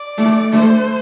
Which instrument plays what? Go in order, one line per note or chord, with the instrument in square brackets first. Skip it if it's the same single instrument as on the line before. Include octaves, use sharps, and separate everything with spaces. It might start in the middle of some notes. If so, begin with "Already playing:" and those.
Already playing: [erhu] D5
[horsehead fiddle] A3
[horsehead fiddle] A3 [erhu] C5